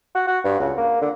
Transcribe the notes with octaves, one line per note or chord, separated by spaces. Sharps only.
F#4
F#4
G2
C#2
A#3
D3